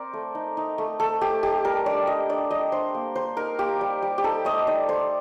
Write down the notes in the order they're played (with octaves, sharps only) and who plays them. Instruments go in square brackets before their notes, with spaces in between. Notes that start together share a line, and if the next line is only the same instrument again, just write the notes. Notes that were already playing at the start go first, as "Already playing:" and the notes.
Already playing: [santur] C4 A#4 C5 D5
A3
D#4
D#4
A3
A3 A4
A3 G4
D#4 G4
G3 A#4
D4 D5
G3 D#5
D4 D5
G3 D#5
D4 C5
A#3
G3 C5
D#4 A#4
A#3 G4
G3
G3
G4
D#4 A4
A3 D#5
D#4 D5
A3 C5